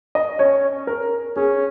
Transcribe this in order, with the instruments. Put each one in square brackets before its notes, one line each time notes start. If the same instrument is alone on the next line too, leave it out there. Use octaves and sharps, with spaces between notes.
[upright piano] D#5
[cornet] C#4 [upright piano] C#5
[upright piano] A#4
[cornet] C#4 [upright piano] G#4